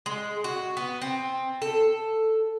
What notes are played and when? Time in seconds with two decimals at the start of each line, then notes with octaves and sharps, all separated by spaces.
0.06 G#3
0.44 F#4
0.77 B3
1.02 C4
1.62 A4